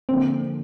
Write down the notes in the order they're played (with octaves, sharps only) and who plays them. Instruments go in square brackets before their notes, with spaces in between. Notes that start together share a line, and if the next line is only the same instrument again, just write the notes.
[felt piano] D3 F3 A#3 [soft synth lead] C4